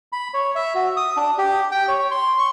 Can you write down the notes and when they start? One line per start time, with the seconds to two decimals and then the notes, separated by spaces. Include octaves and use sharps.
0.12 B5
0.34 C#5
0.55 E5
0.75 F#4
0.97 D#6
1.17 D4
1.38 G4
1.72 G5
1.88 C#5
2.11 C6
2.39 C#6